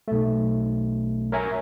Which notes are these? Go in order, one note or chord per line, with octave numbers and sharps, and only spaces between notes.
B1 A3
A#4 C#5 E5 G#5 A#5